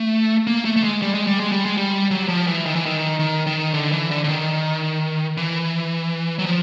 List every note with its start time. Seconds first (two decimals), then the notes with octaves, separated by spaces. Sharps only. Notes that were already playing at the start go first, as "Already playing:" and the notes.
Already playing: A3
0.47 A#3
0.65 A3
0.76 A3
0.84 G#3
1.02 G3
1.14 G#3
1.27 G3
1.40 G#3
1.52 G3
1.65 G#3
1.77 G3
2.11 F#3
2.28 F3
2.47 E3
2.66 D#3
2.76 E3
2.86 D#3
3.19 D#3
3.47 D#3
3.74 D3
3.92 E3
4.11 D3
4.24 D3
4.28 D#3
5.37 E3
6.39 F#3
6.46 F3